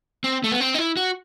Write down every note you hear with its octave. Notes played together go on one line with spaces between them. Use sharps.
C4
A3
B3
C4
D#4
E4
F#4